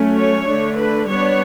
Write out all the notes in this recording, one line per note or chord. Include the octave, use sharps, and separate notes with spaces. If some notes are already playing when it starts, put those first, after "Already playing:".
Already playing: F#3 A3 C#4
C#5
D3 A3 D4
B4
G3 B3 D4 C#5